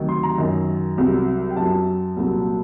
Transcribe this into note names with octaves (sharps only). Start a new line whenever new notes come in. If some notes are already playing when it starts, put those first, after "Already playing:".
Already playing: D2 C3 D#3 F#3
C6
A#5
F#2 D#3 F#3
C2 C3 F#3
G5
F#2 F#3 A5
C2 A#2 F#3